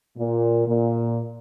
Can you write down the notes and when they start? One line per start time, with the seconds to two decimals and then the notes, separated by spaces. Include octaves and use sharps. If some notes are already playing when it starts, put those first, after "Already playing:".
0.17 A#2
0.68 A#2